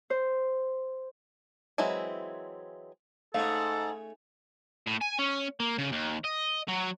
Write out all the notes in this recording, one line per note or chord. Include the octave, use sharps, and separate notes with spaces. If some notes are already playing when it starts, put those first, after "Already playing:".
C5
E3 F#3 G#3 C4 E4
G#2 A3 C#4 A4 F5
A2
G#5
C#4
A#3
C#3
D#2
D#5
F#3